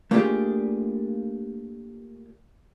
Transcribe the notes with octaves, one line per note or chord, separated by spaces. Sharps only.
A3 A#3 D4 F4 G4 G#4